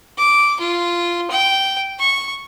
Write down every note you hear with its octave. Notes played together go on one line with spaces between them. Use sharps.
D6
F4
G5
C#6